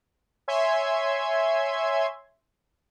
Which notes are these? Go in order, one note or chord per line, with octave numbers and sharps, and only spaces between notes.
C#5 E5 G#5 C6 G#6